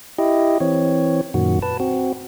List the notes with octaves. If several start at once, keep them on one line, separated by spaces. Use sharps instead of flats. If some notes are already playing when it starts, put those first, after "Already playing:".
E4 G4 D#5
E3 C4 C#5
F#2 A#2 D#3 F#4
B4 A5
C4 F#4